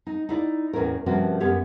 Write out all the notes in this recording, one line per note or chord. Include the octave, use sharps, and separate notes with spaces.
D#4
D#4 E4 D5
E2 A2 C#4 E4 A#4
G2 C3 F3 C#4 F#4 A#4
F#2 B3 C#4 G4 C#5 E5